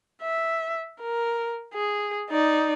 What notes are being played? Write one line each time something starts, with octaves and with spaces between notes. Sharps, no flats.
E5
A#4
G#4
D#4 D5